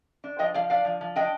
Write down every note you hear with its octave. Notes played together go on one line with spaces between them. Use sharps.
D4
F3 D#5 G5
F3 D5 F5
D4 D5 F5
F3
F3
D4 D#5 G5